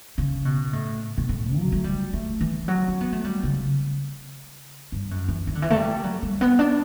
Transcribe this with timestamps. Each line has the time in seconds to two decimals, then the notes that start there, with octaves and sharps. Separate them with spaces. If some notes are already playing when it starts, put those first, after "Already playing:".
0.18 C#3
0.45 B2
0.73 A2
1.18 B2
1.29 A2
1.57 F#3
1.72 A3
1.84 G3
2.13 A3
2.41 E3
2.68 F#3
2.88 C#4
3.01 B3
3.12 A3
3.24 G3
3.43 C#3
4.92 G2
5.11 F#2
5.28 E3
5.47 E3
5.55 D3
5.62 E3
5.70 A3
5.76 G3
6.03 F#3
6.23 G3
6.41 B3
6.59 D4